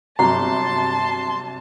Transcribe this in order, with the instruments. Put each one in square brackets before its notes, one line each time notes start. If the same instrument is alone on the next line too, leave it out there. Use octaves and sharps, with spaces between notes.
[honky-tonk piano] G1 C3 F#3 [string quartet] A5 [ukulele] A#5 [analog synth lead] C6